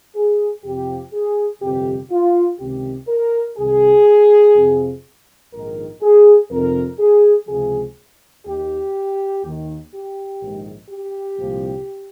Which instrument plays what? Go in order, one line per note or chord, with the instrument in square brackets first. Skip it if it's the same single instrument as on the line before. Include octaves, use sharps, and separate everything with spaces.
[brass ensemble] G#4
F2 C3 F3 G4
G#4
G1 F2 C3 G4
F4
C#2 C3 D#3 G4
A#4
C2 C3 D#3 G#4
F2 C3 F3
A#1 G#2 D#3 A#4
G#4
F2 C3 D#3 A#4
G#4
C#2 C3 F3 G#4
D#2 D#3 G4
D#2 D#3
G4
A#1 G#2 D#3
G4
C2 A#2 F3